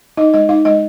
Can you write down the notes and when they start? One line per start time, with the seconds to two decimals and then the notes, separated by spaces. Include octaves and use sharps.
0.17 D#4 D#5
0.34 G#3 D#5
0.49 D#4 F5
0.65 G#3 D#5